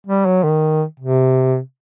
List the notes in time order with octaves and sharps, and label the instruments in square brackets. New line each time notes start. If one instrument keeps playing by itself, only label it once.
[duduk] G3
F#3
D#3
C3